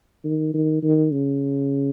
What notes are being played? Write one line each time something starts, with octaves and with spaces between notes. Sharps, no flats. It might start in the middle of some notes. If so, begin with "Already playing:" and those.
D#3
D#3
D#3
C#3